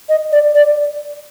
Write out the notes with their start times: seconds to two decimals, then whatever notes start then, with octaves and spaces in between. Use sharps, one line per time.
0.09 D#5
0.32 D5
0.55 D5